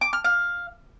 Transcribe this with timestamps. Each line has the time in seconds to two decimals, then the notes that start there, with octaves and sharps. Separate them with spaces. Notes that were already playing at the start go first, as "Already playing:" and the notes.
0.01 D6
0.13 F6
0.24 F5